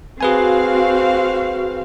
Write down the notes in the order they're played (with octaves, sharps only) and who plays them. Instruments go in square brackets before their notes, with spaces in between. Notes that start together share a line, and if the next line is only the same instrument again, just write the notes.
[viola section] C4 F#4 F5 [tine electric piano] G#4 B4 G#5